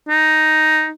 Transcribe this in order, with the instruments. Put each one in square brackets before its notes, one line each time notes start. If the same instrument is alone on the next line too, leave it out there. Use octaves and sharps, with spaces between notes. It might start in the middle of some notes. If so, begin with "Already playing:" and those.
[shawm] D#4